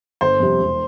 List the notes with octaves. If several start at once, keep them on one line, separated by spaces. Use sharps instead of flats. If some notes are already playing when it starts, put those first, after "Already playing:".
G1 C5
F2 C3 G3 C4
E1